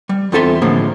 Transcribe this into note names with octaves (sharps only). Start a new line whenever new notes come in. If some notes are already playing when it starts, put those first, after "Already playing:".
G3
E2 C4 F4 A4 E5 C6
A2 D3 F3 G#3 A#3